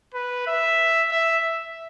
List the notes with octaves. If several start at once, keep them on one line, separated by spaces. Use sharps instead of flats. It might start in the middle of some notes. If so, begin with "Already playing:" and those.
B4
E5
E5